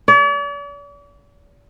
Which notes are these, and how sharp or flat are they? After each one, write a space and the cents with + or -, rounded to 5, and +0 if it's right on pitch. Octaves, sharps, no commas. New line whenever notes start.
D5 -45